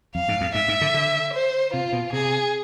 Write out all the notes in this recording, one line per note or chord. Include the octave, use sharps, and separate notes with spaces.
F2 F5
G#2
F2
G#2 E5
G#2
D3
D3
C5
C3 F4
B2
C3 G#4